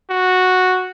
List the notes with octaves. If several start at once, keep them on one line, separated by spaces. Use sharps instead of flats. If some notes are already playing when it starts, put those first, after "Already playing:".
F#4